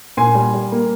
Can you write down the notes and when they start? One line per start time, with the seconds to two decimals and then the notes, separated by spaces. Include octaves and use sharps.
0.17 A#2 G#5 C6
0.35 G3
0.54 G3
0.72 A#3